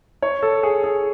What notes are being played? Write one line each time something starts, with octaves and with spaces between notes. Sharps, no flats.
C#5
A4
G#4
G#4